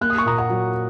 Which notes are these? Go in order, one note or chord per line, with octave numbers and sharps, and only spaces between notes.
A#3 F#6
D#6
C#6
A#2 A#5 D#6
F#5 A#5
F#3